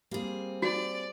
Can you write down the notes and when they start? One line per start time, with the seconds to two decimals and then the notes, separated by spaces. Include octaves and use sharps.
0.11 G3 A#3 C4 G#4
0.62 F#4 D5